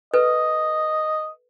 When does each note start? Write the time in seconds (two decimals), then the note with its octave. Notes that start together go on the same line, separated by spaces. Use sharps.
0.14 A4 B4 D#5